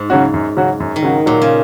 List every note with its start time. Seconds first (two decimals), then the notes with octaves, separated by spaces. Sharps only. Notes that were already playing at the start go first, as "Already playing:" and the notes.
Already playing: G#2
0.10 C#3 F#3 C#4 F#4
0.34 F#2
0.57 C#3 F#3 C#4 F#4
0.80 F#2
0.96 D#3
1.03 C#3 F#3 C#4 F#4
1.26 A#2 F#3
1.42 C#3